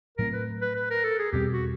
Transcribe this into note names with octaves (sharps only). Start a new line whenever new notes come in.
A2 F#3 A3 C4 A#4
B4
B4
B4
A#4
A4
G#4
E2 B2 G3 C4 G4
F#4